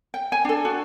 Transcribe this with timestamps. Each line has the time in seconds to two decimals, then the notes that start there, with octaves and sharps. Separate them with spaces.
0.14 G5
0.32 G#5
0.45 D4 A4
0.65 F#4